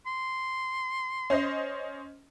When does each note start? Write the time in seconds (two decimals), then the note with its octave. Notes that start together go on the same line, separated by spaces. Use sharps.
0.06 C6
1.30 C#4 C5 D#5